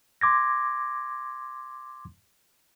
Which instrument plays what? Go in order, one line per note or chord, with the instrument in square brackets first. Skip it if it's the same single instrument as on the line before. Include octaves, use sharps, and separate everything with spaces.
[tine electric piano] C6 D6 G#6 A#6